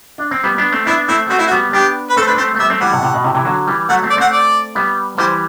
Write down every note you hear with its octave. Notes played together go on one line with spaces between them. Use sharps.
D4
C4
G3 B3
B3 D4
A3 C4
B3 D4 E4
A3 C4 E4
A3 C4 F#4
E4
F#4
G3 B3
B3 D4 G4
B4
A3 C4 A4
C5
D4 B4
A3 C4 C5
A3
G3 B3 E5
A3 C4
E3 G3 F#5
A2 C3
A2 C3
B2
A2 C3
C3 E3
D3 F#3
E3 G3
F#3 A3 F#5
A3 C4
D5
A3 C4 F#5
D5
G3 B3
E3 G3 C5